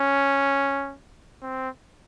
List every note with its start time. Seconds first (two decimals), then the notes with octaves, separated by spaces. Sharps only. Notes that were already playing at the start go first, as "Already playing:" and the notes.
Already playing: C#4
1.42 C4